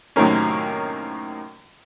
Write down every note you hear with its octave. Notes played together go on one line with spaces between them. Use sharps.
F#2 A2 C3 D#3 A#3 C#4